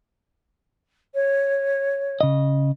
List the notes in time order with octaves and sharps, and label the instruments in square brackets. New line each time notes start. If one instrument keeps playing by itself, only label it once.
[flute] C#5
[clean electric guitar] C#3 D#5